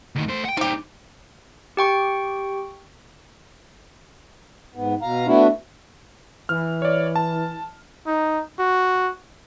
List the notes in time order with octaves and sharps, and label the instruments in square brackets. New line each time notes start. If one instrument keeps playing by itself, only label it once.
[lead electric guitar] D2 D#3
A3 C5
F#5 G5
[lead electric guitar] G3 D#4 [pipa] C4 G4
[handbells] G4 G5 C#6
[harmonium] G#2 B3
B2 F5 A#5
A3 B3 D4 E4 F#4
[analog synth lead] E3 [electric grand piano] F6
[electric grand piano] C#5 D5
A5
[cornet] D#4
F#4